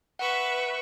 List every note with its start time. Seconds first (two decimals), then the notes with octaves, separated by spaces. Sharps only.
0.19 B4 E5 F#5 C#6